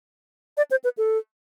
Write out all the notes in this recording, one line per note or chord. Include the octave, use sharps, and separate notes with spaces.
D5
C5
B4
A4